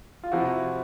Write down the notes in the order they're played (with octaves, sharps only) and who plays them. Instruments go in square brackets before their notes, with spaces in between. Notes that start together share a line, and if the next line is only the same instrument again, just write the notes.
[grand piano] F4
C3 F3 E4 F#4